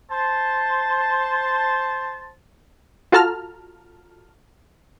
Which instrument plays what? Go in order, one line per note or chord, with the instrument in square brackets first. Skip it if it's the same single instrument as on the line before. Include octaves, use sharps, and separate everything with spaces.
[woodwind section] C5 A5
[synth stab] F4 F#4 A4 A5 A#5 F6